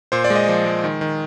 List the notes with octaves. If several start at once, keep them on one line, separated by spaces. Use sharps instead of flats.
A#2 C5
D5
G#3
D#5
F3
G#3
D#3
D#3